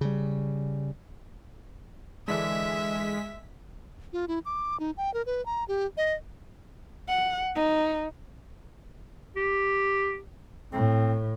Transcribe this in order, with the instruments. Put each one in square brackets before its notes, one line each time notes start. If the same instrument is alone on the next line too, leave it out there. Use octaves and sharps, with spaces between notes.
[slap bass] C#3 G3
[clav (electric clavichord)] D3 E3 D4 [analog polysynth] G#3 B6 [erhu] E5
[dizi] F4
E4
D6
D#4
G5
A#4
B4
A#5
G4
D#5
[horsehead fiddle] F#5
D#4
[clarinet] G4
[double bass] A2 [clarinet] C4